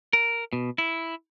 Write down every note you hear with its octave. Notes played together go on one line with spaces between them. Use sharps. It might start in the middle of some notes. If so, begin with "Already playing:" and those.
A#4
B2
E4